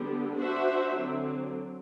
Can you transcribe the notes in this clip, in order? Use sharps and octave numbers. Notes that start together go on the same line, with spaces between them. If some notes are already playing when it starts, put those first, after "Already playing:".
Already playing: D3 G3 B3
D4 F#4 C5 E5
D3 F#3 C4